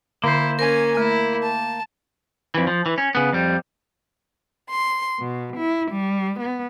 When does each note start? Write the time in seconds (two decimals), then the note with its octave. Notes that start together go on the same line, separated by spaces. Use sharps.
0.24 D3 A#3 E4 C5
0.59 C#4 A#4 G#5
0.97 A3 E4
1.42 A5
2.55 F2 E3
2.67 F3
2.86 E3
2.98 C#4
3.15 C#3 B3
3.32 F2 G3
4.71 C6
5.19 B2
5.55 E4
5.91 G3
6.38 B3